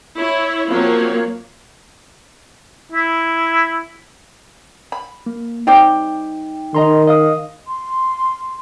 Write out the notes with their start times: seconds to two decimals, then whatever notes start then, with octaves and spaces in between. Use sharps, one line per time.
0.16 E4 C#5
0.69 F3 F#3 A#3 C4 C#5
2.92 E4
4.92 B5
5.26 A#3
5.67 G3 C4 D#4 G4
6.75 D#3 D#5 A#5 C6
7.07 D#5 F5 D#6
7.67 C6